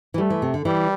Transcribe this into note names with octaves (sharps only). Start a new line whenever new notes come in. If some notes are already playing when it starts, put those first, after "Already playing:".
E3
G3 A3
E3
C3
D3
E3 G3